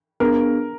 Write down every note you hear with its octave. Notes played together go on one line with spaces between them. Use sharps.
B3 D4 G#4 A#4